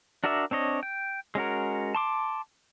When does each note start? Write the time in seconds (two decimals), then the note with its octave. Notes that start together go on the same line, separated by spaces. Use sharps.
0.24 D4 F#4 A#4 D5 E5
0.51 C4 D4 C#5 D#5
0.83 G5
1.35 G#3 C#4 F#4 A#4
1.95 A5 C6 D6